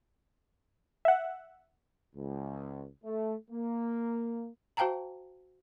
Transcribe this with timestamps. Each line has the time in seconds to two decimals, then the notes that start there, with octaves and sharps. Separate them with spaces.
1.05 E5 F#5
2.16 C#2
3.04 A3
3.51 A#3
4.77 F#4 C5 F5 G5 A5 A#5